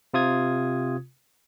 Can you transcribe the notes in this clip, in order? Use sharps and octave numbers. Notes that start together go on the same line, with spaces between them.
C3 F4 D#6 G#6